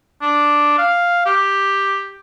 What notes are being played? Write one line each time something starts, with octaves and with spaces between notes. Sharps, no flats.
D4
F5
G4